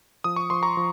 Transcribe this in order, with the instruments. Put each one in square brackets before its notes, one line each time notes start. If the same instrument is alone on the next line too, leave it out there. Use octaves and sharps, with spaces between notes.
[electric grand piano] F3 D#6
C#6
F3 C6
A#5 C#6
F3